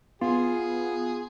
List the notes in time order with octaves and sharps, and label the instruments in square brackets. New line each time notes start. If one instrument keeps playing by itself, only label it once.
[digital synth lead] B3 [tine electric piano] F4 [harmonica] G#4